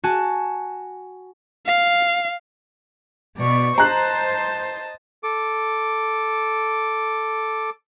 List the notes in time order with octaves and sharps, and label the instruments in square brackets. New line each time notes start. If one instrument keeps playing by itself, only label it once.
[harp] F#4 G#5 A5
[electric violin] F5
[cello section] B2 [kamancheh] D5 C#6
[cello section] C5 [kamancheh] D#5 A5 [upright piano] A#5 F#6
[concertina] A4 D6